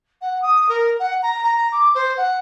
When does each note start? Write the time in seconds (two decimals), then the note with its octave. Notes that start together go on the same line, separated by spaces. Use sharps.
0.21 F#5
0.42 D#6
0.69 A#4
0.99 F#5
1.23 A#5
1.44 A#5
1.72 D6
1.95 C5
2.17 F#5